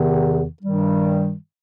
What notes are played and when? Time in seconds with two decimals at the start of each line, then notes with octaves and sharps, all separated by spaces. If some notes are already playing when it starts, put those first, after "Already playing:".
Already playing: E2 C3 D#3
0.62 G2 D#3 G3